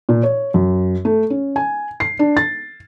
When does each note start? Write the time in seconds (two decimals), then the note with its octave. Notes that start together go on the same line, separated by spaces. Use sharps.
0.09 A#2
0.23 C#5
0.54 F#2
1.05 A3
1.30 C#4
1.56 G#5
2.00 C7
2.19 D4
2.37 A6